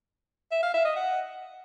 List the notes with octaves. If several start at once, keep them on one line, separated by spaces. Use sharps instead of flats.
E5
F5
E5
D#5
F#5